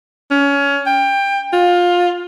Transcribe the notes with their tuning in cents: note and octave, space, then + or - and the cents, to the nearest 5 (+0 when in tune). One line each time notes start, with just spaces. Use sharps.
C#4 +25
G5 +20
F4 +20